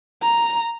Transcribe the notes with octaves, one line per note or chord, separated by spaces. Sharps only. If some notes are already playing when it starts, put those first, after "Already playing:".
A#5